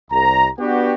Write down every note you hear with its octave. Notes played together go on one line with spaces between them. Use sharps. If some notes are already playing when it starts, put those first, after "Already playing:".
C2 A#5
B3 D4 F#4 G4